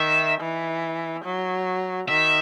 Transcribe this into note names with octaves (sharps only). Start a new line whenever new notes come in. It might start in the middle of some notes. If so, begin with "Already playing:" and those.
Already playing: D#3 E5
E3
F#3
D#3 E5